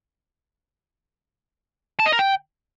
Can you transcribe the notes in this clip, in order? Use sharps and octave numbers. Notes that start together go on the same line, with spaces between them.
A5
D#5
A#4
G5